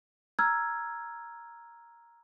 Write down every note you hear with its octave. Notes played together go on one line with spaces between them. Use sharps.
A#5 E6 F6 G#6